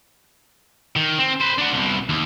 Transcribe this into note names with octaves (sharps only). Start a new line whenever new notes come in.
D#3
C4
B4 C5
D4 F#4
C2 B2
D#2